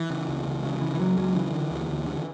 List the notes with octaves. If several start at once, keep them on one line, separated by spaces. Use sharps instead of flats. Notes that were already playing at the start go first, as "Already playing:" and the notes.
Already playing: E3
C#3
C#2
C#2
C#3
C#3 E3
E3
C#2 F#3
C#2 F#3
C#3 E3
D3
D2
D2
D3